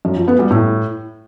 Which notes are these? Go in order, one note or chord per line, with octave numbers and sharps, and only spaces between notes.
F#2
F3
B3
G3
A2